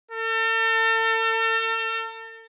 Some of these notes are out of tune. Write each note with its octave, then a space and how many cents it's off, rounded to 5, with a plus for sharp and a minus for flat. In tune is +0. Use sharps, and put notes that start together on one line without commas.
A4 +40